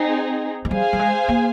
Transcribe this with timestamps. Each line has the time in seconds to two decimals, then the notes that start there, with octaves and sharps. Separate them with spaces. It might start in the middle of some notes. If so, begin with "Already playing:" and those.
Already playing: C4 D#4 G#4
0.65 G#3
0.71 G3 G#4 C5 F5 G#5
0.93 G3
0.99 G#3
1.28 A#3